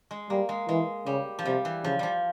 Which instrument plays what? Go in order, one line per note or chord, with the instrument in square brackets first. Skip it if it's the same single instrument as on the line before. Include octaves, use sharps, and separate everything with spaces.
[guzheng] G#3
[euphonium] G3 [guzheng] A#3
[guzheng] G#3
[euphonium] E3 [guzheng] G#3
[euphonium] C#3 [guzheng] G3
[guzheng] F3
[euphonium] C3 [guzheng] G3
[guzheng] E3
[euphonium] C#3 [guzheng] F3
[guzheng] F3 G3